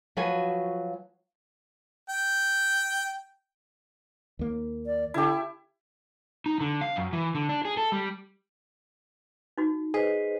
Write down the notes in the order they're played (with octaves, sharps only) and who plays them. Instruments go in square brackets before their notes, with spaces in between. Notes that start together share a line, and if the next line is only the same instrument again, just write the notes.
[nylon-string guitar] F3 F#3 F4 F#4 B4 G#5
[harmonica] G5
[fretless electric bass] D#2 A#3
[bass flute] D5
[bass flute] D3 [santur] E4 G4
[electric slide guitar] D#4
D3
F5
F#2
E3
D3
D4
G#4
A4
G3
[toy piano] D#4 F#4
[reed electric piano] G#4 [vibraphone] B4 C5 D#5